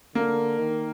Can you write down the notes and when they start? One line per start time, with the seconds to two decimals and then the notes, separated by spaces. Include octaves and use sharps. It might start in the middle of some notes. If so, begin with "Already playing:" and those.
0.15 D3 A#3
0.58 D#3